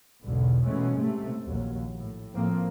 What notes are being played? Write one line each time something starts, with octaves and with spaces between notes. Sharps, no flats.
B1 E2 G#2 B2 D3
B2 E3 G#3 A3 C#4
G#2 C3 A3
A#1 D#2 F#3
A2
A2 F3 A3 A#3 C4